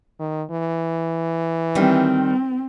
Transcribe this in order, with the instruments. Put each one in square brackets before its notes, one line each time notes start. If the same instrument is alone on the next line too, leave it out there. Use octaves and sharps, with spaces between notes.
[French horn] D#3
E3
[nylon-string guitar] D#3 G3 [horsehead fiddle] C4